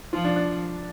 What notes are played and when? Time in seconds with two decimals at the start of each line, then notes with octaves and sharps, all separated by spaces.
0.13 F3 F4
0.25 D4
0.36 D4